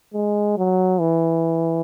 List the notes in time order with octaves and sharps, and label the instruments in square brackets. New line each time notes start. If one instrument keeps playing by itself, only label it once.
[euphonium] G#3
F#3
E3